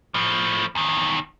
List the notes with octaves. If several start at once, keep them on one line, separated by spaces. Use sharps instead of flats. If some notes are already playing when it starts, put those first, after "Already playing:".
A2 F3
E2 D#3